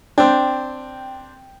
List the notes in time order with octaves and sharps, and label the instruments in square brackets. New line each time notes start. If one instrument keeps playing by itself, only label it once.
[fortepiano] C4 D4 [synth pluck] G5